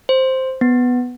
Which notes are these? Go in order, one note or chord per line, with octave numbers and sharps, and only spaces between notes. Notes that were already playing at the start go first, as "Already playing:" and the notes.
C5
B3